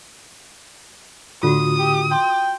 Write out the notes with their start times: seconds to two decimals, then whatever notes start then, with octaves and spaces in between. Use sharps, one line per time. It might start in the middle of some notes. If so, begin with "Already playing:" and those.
1.43 A2 D3 F4 F#4 D#6
1.79 G4
2.11 G5 C6